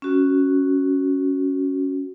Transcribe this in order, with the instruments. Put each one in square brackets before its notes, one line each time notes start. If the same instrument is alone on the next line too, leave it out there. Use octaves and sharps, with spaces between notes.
[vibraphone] C#4 F#4